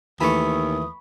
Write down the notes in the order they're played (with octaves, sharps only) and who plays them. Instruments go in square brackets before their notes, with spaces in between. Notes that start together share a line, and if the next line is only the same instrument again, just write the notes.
[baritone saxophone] D#2 [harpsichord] E3 A3 [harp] B5 C#6 [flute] D#6